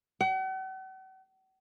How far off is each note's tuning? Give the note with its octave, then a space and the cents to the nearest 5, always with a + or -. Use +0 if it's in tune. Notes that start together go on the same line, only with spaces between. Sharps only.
F#5 +45